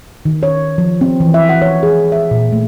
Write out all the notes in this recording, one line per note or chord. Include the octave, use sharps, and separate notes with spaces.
D#3
C#5
F3
C4
E3
E5
F#5
C#5
G#4
E5
A#2
A3